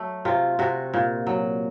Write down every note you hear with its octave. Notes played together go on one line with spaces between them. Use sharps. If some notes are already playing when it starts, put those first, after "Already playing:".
Already playing: F#3 A3
C3 F4
C3 F#4
A#2
F#3